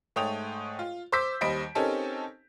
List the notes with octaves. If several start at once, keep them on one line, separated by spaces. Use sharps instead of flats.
G#2 A3 C#5 G5 D#6 F7
F4
C5 C6 D6 E6 G6 B6
D#2 G3 C5 D#5 B5 D7
C4 C#4 D#4 G4 A4 A#4